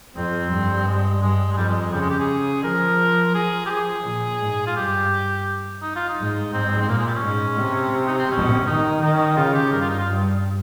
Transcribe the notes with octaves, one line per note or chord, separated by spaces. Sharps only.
F2 C4
G2
G#3
G2 G#3
G#3
F2 G3
G#3
G#3
C#3 G3
G#3
G4
G#4
F3 A#4
F3 G#4
G4
G#4
A#2
G#2
F4
G2 G4
D#4
F4
D#4
G#2
G#2 C4
C4
A#2 A#3
G#3
G3
C#4
G#2
C3
D#4
C4
C3 C#4
D#3 D#4
D#3 D#4
C#4
D#4
C#3 F4
G4
G2 A#4
F4
D#4
F4
G2